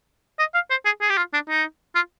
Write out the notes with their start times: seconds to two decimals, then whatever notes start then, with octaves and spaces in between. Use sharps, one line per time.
0.39 D#5
0.55 F5
0.70 C5
0.85 G#4
1.02 G#4
1.10 G4
1.17 F4
1.33 D4
1.49 D#4
1.95 F4